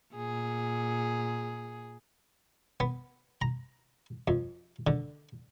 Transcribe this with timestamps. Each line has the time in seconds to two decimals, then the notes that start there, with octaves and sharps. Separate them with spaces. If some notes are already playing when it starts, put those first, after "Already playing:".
0.15 A#2 G#4
2.80 B3
3.42 A#5
4.28 F2
4.87 D3